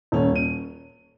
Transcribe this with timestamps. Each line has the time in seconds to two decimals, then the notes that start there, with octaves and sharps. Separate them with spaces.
0.12 D#1 C#4
0.36 D#7